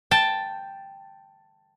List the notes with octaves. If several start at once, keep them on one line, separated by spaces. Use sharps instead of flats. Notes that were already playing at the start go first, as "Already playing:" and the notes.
G5 A5